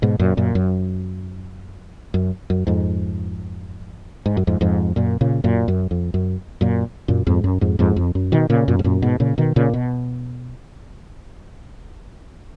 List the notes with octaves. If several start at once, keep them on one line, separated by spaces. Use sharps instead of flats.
G#2 B2
F#2 A#2
F#2 A#2
F#2
F#2
F#2
F2 G#2
G#2
F#2
F2 G#2
F2 G#2
F#2 A#2
A#2 C#3
F#2 A#2
F#2
F2
F#2
F#2 A#2
F#2 A#2
F2 G#2
F#2
F2 G#2
F2 G#2
F2
F#2
B2 D#3
A#2 C#3
F#2 A#2
G#2
F#2 A#2
G#2 B2
A#2 C#3
B2 D#3
A#2 C#3
B2